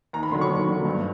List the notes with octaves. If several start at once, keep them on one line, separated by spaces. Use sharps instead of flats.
D#2 A#5
B5
D3 F#3 C6
C#6
D#2
D3 F#3
G2